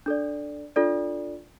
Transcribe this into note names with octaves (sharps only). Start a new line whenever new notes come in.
D4 A4 D5
D4 F4 A4 D5